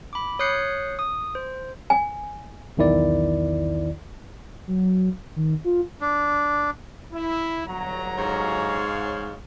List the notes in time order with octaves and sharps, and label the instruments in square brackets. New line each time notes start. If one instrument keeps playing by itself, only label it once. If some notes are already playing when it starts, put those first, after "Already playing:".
[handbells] B5 D6
C#5 D#6 F#6 G6 C7 C#7
D#6
C5
[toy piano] G#5
[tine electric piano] B1 E2 D#3 E4 D5
[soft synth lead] F#3
D#3
F4
[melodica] D4
[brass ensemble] E4
G1 F#3 A#5
[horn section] G#2 C#5 F5